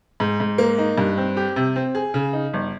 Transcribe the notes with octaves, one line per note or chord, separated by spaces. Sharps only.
G#2
G#2
A#3
D#4
G2
C4
G4
C3
C4
G#4
C#3
D#4
G1